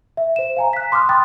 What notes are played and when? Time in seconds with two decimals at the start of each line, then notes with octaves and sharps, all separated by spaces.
0.17 E5
0.36 C5 E7
0.57 F5 G#5 A#5
0.73 F#6 B6
0.92 C6 D6 D#6 F6 F#6
1.09 G5 B5 C6 D#6 F#6 A6